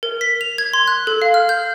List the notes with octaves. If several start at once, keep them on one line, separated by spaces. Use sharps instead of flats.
A#4
B6
F7
G#6
C6
F#6
A4
F5
F6
G6